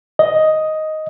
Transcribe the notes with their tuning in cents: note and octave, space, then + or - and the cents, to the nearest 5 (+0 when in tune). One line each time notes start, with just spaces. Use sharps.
D#5 +5